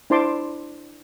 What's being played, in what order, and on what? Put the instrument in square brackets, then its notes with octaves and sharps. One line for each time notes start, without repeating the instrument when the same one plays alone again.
[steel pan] D4 E4 C5 A5 C6 D6